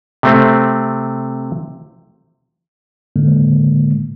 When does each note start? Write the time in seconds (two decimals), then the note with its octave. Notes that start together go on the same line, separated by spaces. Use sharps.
0.23 C3 A3 C4
3.16 A2 D3 G#3 A#3